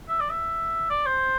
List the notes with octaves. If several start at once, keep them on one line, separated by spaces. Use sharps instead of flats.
E5
D5
E5
D5
C5